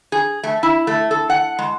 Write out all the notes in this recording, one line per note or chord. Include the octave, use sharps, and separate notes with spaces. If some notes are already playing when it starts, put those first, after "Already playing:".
G#4
A3
E4
A3
A4
F#5
G#3